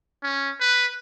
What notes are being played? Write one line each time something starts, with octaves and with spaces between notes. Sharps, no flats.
C#4
B4